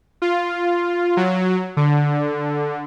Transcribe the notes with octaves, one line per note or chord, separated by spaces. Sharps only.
F4
F#3
D3